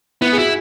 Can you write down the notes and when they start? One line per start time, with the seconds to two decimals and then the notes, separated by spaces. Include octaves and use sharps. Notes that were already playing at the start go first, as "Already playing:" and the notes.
0.21 B3 E4
0.32 G#4
0.38 E4 F#4